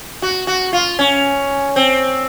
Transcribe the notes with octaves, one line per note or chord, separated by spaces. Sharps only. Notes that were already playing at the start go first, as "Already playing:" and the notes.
F#4
F#4
F4
C#4
C4